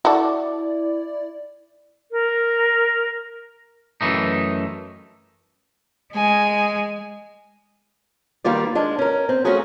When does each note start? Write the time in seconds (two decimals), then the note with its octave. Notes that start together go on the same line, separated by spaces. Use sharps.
0.05 E4 F#4 A4 D5
2.11 A#4
4.01 F#2 E3 A3 D#4
6.13 G#3 G#5
8.44 D#3 G3 A#3 F4 D5
8.75 G#3 D4 F4
8.99 C#4 A#4
9.29 C4
9.44 A3 C#4 F4 F#4 G#4 A#4